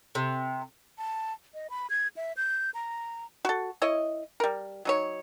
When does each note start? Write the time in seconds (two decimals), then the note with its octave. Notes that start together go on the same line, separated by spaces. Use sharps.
0.15 C3
0.98 A5
1.54 D#5
1.70 B5
1.90 G#6
2.17 E5
2.37 G6
2.74 A#5
3.45 F#4 A4
3.82 E4 C#5 D#5
4.40 G3 A#4
4.85 F#3 D#4 C#5